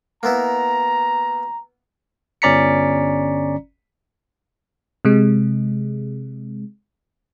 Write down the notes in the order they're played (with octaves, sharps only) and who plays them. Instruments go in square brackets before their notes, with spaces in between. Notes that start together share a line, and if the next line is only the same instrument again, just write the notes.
[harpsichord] A#3 B3 E4 [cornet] A#5
[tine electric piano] G1 C#4 D5 A#5 B6 C#7
[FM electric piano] C3 G#3